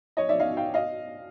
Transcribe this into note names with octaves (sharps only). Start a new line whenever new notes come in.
C#5 D#5
D5 E5
D#5 F5
F5 G5
D#5 F5